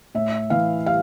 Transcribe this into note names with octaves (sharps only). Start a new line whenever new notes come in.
A2 E5
E3 F5
G3 F5